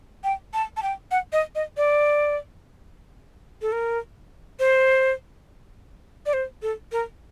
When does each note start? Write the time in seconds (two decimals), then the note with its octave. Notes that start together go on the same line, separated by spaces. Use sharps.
0.24 G5
0.54 A5
0.77 A5
0.83 G5
1.11 F#5
1.33 D#5
1.55 D#5
1.77 D5
3.62 A4
3.72 A#4
4.59 C5
6.26 D5
6.33 C5
6.62 A4
6.92 A#4